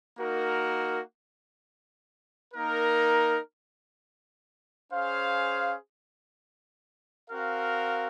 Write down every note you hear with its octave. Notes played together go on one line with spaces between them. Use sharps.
A#3 D#4 F#4 A#4
A#3 D#4 A#4
C#4 G#4 C5 F5
C4 F#4 A#4 F5